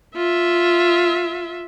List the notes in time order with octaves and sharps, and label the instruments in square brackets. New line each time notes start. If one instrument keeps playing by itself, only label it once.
[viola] F4 E5